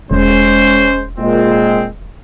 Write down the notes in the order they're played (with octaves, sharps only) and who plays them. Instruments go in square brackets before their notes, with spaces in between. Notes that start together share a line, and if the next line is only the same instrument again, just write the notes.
[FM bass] E1 [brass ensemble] G#3 C#4 C5
[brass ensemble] A#2 G#3 C4